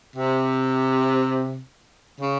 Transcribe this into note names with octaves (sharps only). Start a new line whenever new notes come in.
C3
C#3